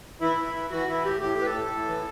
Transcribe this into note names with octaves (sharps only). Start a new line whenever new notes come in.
E3 E4
E3
E3
E3 F#4
E3 E4
A2 G4
A2 G4
A2 B4
A4
A2
A2
E3